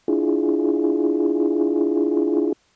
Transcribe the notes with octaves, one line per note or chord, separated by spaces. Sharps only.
D4 E4 F4 G#4